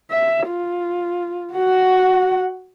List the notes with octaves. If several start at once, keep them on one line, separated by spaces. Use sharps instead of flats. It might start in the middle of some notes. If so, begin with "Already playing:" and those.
E5
F4
F#4 F#5